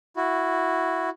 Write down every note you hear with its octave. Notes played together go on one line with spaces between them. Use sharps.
E4 F#4